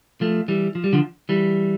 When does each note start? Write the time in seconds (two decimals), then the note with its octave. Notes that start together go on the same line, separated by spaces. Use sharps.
0.21 F3 A3
0.48 E3 G3
0.75 F3
0.84 G3
0.93 D3 F3
1.29 E3 G3